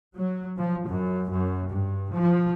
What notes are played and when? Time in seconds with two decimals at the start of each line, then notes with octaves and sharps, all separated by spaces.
0.15 F#3
0.57 F3
0.86 F#2
1.28 F#2
1.69 G2
2.12 F3